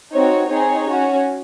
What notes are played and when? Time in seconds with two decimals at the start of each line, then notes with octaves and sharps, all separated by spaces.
0.13 C4 D#4 F#4 C#5
0.50 C4 D#4 G#4 C#5
0.87 C#4 F#4